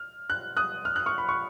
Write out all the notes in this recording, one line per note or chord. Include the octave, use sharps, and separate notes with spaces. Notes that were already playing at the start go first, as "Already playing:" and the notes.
Already playing: F6
F#6
D#6 F#6
F6
F#6
C#6 F6
B5
C#6